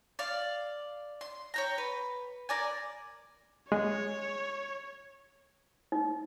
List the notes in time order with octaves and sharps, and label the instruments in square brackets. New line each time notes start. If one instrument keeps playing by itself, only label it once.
[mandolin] D5 F5
C6
C#5 G5 A#5
B4
A#4 D5 G#5
[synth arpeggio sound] G#3 [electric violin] C#5
[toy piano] D#4